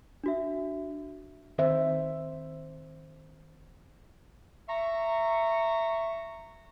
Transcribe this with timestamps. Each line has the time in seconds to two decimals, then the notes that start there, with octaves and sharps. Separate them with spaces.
0.24 D4 F#4 E5
1.58 D#3 C4 C5 E5
4.69 E5 A#5 C#6